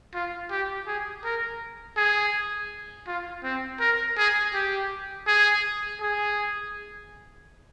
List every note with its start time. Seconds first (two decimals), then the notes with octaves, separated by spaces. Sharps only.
0.14 F4
0.51 G4
0.87 G#4
1.24 A#4
1.97 G#4
3.07 F4
3.44 C4
3.80 A#4
4.17 G#4
4.54 G4
5.27 G#4
6.00 G#4